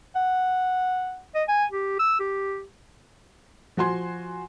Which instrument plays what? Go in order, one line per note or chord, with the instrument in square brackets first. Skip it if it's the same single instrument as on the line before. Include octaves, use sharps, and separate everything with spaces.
[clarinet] F#5
D#5
G#5
G4
E6
G4
[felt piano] F3 F#4 G#5 C6